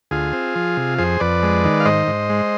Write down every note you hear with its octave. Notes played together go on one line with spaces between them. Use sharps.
D2 F4 G#4
C4
F3
C3
F2 G#4 C5
F2 B4 D5
G#3
D#3
F5
G#2 C5 D#5
G#2
G#3